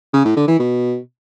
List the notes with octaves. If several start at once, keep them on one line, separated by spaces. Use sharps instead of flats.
C#3
A2
D3
E3
B2